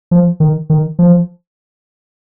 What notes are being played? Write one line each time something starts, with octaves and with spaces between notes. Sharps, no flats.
F3
D#3
D#3
F3